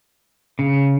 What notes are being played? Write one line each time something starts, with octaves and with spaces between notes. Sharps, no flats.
C#3